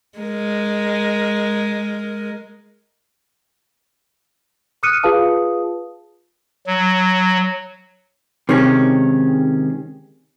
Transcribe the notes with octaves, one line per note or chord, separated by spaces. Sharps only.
G#3 A#4
D6 D#6 F6 F#6 C#7 D#7
F4 G#4 B4 F5 A5 D#6
F#3
C3 D#3 G#3 C#4